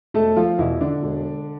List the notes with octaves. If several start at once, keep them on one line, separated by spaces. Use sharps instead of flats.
E1 A3 A4
F3 F4
E2 B2 E3 E4
D3 D4
E1